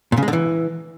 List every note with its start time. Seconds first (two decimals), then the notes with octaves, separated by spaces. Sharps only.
0.12 A#2
0.17 C#3
0.23 G#3
0.28 D3
0.33 E3